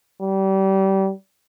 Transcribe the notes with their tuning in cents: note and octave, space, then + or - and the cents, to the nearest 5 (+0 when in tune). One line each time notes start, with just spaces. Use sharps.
G3 -25